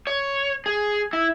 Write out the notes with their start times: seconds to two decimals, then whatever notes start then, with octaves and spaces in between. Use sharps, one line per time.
0.07 C#5
0.66 G#4
1.13 E4